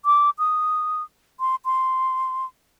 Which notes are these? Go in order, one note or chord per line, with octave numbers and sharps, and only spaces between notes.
D6
D#6
C6
C6